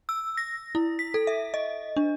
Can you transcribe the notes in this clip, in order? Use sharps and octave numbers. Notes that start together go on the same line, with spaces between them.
E6
A#6
E4
B6
A4
E5
D#5
D4